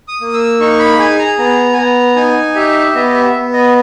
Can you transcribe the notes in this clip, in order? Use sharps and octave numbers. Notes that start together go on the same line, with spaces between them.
D#6
A#3
E6
D#4 C#6
B5
G#4 G#5
A#5
B3 A#5
G#5
B3 A#5
D#4 G#5
G4 E5
B3 D#5
E5
B3
D#5